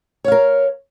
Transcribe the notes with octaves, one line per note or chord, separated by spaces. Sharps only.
A#4 C#5 F5